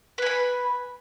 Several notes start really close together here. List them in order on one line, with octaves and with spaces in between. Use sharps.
B4 G#5 B5